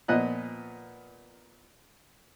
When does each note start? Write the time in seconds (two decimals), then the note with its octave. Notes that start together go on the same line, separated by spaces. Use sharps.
0.08 A#2 F3 B3 D#5 F#6